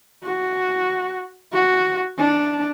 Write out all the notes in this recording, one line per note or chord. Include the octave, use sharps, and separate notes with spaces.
F#4
F#4
D4